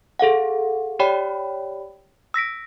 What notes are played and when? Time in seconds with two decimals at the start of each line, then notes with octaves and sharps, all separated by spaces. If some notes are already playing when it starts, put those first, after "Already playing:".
0.19 G#4 A4 F5 F#5
0.99 G4 C#5 D5 G5 B5
2.34 E6 A#6 B6 D7